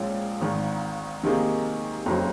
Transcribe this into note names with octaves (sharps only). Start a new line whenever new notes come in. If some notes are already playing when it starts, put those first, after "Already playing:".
Already playing: A#1 A#2 F3 G#3 C#4
G#1 G#2 D#3
C3 D#3 A#3 D#4 G#4
F#1 F2 C#3 F#3 C4